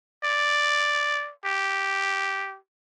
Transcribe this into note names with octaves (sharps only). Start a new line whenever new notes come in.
D5
G4